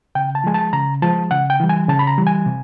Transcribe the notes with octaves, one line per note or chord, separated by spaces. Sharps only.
C#3 G5
A5
F3 G#3 G#5
A5
C#3 A#5
F3 G#3 A5
C#3 F#5
G5
E3 G3
G#5
C#3 A5
B5
A#5
E3 G3
G#5
C3